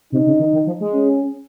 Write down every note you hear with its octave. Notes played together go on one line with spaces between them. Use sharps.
C3 D#4
C#3
D#3
D#3
F3
G#3
C#4